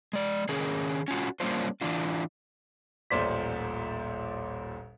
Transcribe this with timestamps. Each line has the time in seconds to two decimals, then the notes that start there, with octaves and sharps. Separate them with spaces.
0.13 G#3 D5
0.49 D#3 C#4 G#4 A#4
1.08 C#4 F4 F#4
1.40 G3 A#3 C#4 D4 F4 C5
1.81 E3 D4 F4
3.10 D#1 A1 A#2 C5 D5 B6